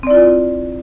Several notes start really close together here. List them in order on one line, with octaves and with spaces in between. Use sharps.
C4 D5 E4 F4